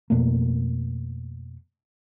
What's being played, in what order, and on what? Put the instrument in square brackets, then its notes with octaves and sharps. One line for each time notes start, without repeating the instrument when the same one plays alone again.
[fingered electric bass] F2 B2 A3 A#3